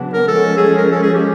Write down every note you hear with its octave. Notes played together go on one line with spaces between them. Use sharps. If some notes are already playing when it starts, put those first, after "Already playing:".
Already playing: C#3 F#3 B3 D4 F#4
A#4
F3 G#3 C#4 A4
G#4
A#4
A4
G#4
G4